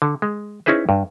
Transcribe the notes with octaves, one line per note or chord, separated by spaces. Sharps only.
D3
G#3
C#4 D#4 E4 G#4 B4 C5
G2